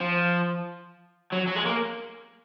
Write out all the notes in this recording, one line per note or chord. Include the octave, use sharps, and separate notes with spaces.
F3
F#3
F#3
G#3
A#3